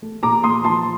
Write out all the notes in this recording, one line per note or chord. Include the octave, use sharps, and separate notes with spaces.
A3
A#2 A#5 D6
A#2 C6 D#6
F3 A5 C6